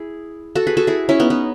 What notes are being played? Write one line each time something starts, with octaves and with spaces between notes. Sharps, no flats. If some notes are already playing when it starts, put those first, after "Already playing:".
Already playing: E4 G#4
F#4 A4
G#4 B4
F#4 A4
E4 G#4
C#4 E4
B3 D#4
B3 D#4